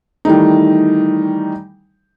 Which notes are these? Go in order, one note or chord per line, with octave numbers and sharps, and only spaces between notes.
D#3 E3 G3 A3 D#4